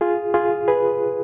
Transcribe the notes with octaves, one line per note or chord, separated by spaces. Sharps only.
F4 G#4
F4 G#4
G#4 B4